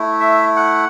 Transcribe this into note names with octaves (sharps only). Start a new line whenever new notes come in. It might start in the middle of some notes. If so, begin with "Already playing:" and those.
Already playing: A3 E4
E5
F#5